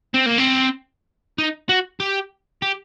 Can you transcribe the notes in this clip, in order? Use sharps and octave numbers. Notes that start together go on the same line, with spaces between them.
C4
A#3
C4
D#4
F#4
G4
G4